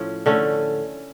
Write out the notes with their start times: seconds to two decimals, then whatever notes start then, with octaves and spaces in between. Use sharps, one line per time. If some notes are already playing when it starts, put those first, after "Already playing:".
Already playing: A2 F3 C#4
0.26 D3 A3 C#4